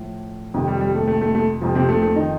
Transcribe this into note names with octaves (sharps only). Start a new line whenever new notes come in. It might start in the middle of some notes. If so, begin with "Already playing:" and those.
Already playing: A2 F3
F2 C3 D#3
G3
G3
A3
A3
A3
A3
F2 C3 F3
C3 C4
A3
A3
D#3 D#4